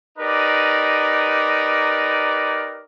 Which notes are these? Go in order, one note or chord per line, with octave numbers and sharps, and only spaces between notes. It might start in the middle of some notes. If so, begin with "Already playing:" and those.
D#4 G4 A#4 B4 D5